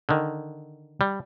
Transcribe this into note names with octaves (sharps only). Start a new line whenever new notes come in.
D3 D#3
G3